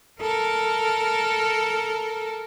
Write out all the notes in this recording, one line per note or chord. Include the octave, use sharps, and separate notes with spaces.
A4 A#4